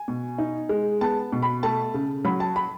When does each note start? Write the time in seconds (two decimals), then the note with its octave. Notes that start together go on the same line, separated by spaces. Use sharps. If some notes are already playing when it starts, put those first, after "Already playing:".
Already playing: G#5
0.08 B2
0.38 D#4
0.69 G#3
1.01 B3 A5
1.32 B2
1.42 B5
1.63 A3 A5
1.94 C#3
2.25 F#3 B5
2.40 A5
2.56 B5